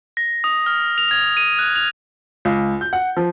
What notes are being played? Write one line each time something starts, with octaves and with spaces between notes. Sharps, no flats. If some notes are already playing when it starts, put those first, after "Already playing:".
A#6
D#6
F6
F7
G#6
D#7
F#6
F7
C#2
G6
F#5
F3